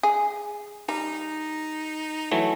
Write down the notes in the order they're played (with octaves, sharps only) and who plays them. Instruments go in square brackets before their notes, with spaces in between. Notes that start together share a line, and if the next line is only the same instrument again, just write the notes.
[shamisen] G#4
[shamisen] G3 A#5 [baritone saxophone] D#4
[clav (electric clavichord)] E3 F#3 A3